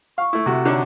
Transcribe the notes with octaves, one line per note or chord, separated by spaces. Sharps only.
F5 C#6
A3 E4
C3 F#4
D3 D4 D#4 C#5